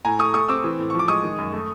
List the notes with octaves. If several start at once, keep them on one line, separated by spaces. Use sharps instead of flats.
A2 G#5 A#5
A3 C#6 D#6
A3 C#6 D#6
C4 D6 E6
E3
A2
C#6
F3
D6
G#3 C#6 D#6
D#3
F#2
A3